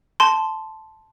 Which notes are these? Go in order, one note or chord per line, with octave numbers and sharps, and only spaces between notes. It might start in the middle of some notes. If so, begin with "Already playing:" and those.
A5 C6